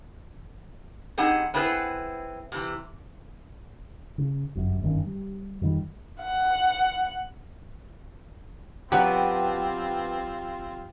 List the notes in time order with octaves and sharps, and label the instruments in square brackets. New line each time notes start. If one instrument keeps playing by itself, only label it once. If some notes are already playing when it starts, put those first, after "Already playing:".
[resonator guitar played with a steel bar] G3 C4 D#4 G#4 F#5
B3 C4 E4 G#4 B4
C3 E3
[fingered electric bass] C#3
G1 F#2
F#1 G2 D#3 C#4
G3
F2 D#3 G3
[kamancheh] F#5
[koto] F#3 [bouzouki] B3 D4 B4 [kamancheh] C4 F4 [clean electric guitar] G4